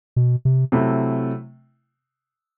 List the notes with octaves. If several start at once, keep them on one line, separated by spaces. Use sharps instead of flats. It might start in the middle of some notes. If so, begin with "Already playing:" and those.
B2
C3
C3 F#3 A3 E4